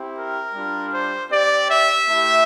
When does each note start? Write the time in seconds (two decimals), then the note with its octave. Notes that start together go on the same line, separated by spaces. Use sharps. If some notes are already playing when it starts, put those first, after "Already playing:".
Already playing: C4 E4 G4
0.16 A#4
0.54 G3 D4 F4
0.92 C5
1.31 C4 G4 D5
1.69 E5
2.08 A3 E4 G4